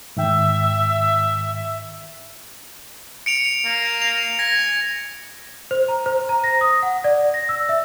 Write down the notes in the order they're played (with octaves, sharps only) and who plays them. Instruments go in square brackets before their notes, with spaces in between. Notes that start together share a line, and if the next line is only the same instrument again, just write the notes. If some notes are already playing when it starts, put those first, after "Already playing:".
[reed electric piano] G#2 D#3 G5 [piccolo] E5
[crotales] C#7 D7 F7
[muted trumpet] A#3
[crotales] F7
[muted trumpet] G#5 [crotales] A#6
[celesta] C5
A#5
C5
A#5
A#6
D#6
F#5
D5
A#6
E6
E5